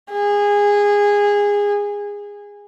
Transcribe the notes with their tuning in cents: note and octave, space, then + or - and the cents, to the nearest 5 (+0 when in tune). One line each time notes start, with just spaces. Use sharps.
G#4 -20